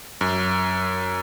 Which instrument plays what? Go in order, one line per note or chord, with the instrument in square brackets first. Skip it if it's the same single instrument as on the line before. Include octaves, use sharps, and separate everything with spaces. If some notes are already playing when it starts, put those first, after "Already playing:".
[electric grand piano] F#2